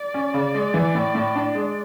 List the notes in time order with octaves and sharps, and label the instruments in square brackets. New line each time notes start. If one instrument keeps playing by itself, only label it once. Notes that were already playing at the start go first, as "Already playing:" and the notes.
Already playing: [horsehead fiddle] D5
[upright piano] C#4
C#3
G#3
E3
A2
A2
D4
G#3